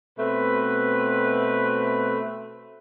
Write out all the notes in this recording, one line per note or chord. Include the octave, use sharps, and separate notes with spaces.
B2 A3 C4 B4